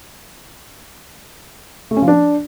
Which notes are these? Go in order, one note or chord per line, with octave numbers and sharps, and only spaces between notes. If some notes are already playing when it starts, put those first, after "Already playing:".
A3
C#4
F3
D4